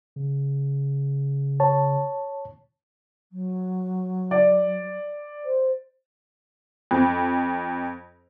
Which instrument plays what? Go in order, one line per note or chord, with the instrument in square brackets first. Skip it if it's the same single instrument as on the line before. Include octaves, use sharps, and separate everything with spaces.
[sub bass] C#3
[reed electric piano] C#5 A5
[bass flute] F#3
[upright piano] D5
[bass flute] C5
[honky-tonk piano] F2